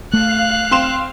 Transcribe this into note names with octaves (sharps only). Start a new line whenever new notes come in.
A3 F5 F#6
C4 C6 E7